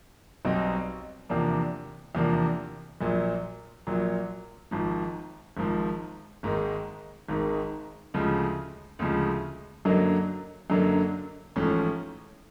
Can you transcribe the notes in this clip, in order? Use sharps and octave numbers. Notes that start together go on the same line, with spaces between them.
B1 B2 G3 C4 D#4
E2 C3 F3 A#3 D4
E2 C3 F3 A#3 D4
A#1 A#2 F#3
A#1 A#2 F#3
G#1 G#2 F3
G#1 G#2 F3
G#1 G#2 D#3 G#3
G#1 G#2 D#3 G#3
D2 C#3 F3 G#3
D2 C#3 F3 G#3
F#2 D3 F#3 A#3 D#4
F#2 D3 F#3 A#3 D#4
A1 G#2 F3 A3 C#4